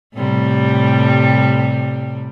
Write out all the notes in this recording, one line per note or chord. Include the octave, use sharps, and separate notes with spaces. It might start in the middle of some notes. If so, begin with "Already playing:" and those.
A2 C3 G3